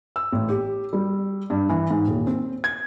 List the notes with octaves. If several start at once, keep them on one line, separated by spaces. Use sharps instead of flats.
E6
A1
G4
G3
G2
E3
G#2
D#1
C4
G#6